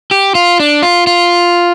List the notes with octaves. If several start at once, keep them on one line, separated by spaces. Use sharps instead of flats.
G4
F4
D4
F4
F4